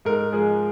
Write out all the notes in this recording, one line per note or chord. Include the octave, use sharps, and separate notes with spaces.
G#2 A#4
F3 G#3 G#4